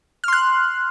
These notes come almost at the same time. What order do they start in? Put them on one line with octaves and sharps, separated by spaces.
F6 C6 F#6